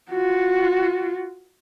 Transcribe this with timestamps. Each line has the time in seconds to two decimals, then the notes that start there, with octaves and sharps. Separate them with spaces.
0.11 F4 F#4